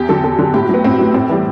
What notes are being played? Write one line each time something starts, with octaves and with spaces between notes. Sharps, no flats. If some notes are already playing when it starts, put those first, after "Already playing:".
Already playing: E2 G4
D3 F#3 A4
E2 A4
D3 F#3
A2 G4
F#4
F#3 B3
A2 C4
F#3
A2 C4
E3 G3